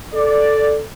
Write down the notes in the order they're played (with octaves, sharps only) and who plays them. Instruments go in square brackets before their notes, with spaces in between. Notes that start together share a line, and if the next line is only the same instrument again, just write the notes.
[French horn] A4 [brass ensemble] D5